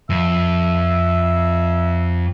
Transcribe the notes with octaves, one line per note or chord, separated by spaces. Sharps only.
F2 E5